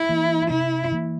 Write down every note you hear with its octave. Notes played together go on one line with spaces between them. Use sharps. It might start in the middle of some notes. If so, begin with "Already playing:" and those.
Already playing: E4
E3 A#3
C3 E4
E3 A#3